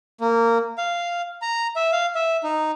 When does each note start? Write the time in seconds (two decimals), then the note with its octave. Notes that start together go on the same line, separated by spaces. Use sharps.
0.21 A#3
0.78 F5
1.42 A#5
1.76 E5
1.92 F5
2.15 E5
2.44 D#4